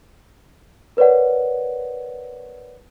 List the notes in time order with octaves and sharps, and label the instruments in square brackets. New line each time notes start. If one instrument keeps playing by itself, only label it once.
[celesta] A#4 B4 C#5 D5 F#5